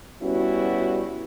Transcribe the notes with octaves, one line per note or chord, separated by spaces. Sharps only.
G3 B3 C#4 E4 F#4